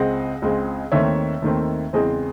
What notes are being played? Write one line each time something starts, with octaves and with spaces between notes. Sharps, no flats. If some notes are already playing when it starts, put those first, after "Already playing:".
Already playing: C#2 C#3 G#3 C4 D#5 F#5
C#2 C#3 G#3 C4
D#2 D#3 A3 C4 C#5 E5
D#2 D#3 A3 C4
E2 C#3 G#3 C4 C5 D#5